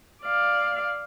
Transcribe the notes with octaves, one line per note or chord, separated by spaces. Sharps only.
D5 F5